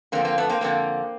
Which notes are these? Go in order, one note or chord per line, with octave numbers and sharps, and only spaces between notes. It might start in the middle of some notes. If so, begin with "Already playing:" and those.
F2 D3 A#3 C4
A#3 C4
A3 B3
A#3 C4
F2 D3 A#3 C4